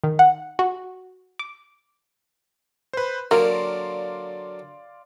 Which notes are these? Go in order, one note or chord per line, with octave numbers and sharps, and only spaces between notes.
D#3
F#5
F#4
D6
B4 C5
D3 F#3 A#3 A#4 D5 F5 C6